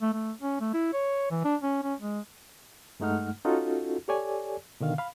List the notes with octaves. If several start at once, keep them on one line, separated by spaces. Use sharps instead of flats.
A3
A3
C#4
A3
E4
C#5
E3
D4
C#4
C#4
G#3
G2 G#3 A3 D#4 F#5 F6
C#4 D#4 F4 F#4 A4
G4 A4 C#5 D5 G#5
B2 D3 D#3 F5
F5 B5